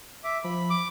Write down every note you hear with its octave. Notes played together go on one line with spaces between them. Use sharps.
E5 D6
F3 B5
D6